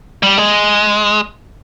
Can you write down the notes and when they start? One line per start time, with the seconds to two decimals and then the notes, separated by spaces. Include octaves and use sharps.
0.23 G3
0.38 G#3